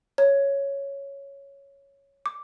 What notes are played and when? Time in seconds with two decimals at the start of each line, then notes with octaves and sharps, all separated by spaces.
0.18 C#5
2.26 D6